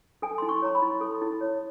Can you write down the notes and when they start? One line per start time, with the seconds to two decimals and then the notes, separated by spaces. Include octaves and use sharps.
0.22 A4 G#5
0.38 E4 C6
0.49 C#6
0.62 C#5 A#5
0.75 B5
0.82 E4
1.01 A4
1.21 E4
1.41 C#5